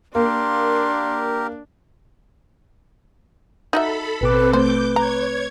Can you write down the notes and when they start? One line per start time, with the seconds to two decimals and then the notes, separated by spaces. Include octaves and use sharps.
0.15 A#3 D4 G4 A#4 C6
3.73 D#4 F#4 A4 E5 B5
4.21 A1 B2 C4 A4 B4 D6
4.53 A3 C4 B4 C5 D6 G6
4.96 C#5 A#5 G#6